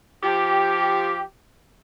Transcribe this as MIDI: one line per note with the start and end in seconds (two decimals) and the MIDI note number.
0.23 1.23 53
0.23 1.23 67
0.23 1.21 79